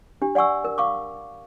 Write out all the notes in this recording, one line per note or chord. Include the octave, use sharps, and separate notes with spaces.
D4 G4
D5 F#5 G#5 C#6 E6
A#4
F5 C#6 D6